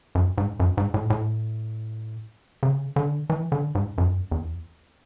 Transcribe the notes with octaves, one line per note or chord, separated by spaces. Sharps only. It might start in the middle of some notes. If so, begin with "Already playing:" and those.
F#2
G#2
F#2
G#2
A2
A2
C#3
D3
E3
D3
G#2
F#2
E2